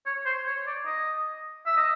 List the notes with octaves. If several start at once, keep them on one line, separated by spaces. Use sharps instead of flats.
C#5
C5
C#5
D5
D#5
E5
D#5